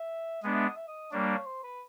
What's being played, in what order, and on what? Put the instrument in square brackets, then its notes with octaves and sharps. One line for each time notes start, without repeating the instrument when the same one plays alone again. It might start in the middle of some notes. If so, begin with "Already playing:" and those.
Already playing: [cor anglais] E5
[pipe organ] G#3 B3 D4 [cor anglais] D#5
[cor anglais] E5
D#5
E5
D#5
[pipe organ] G3 A#3 D4 [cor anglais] C#5
[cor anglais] C#5
C5
B4